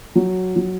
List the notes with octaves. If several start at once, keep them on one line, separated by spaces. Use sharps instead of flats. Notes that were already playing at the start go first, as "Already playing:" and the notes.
F#3
F#3